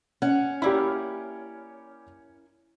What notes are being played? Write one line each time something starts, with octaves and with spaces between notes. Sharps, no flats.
C#4 F#5
A#3 E4 G4 D5 B5